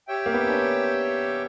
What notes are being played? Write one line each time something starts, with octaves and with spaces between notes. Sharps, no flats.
G4 C#5 E5 G5
A#3
B3
C#4
D4